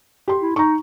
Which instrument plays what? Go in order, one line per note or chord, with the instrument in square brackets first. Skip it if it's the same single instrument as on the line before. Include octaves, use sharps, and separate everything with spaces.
[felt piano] G4 C6
[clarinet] E4
[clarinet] D#4 [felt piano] A#5 C#6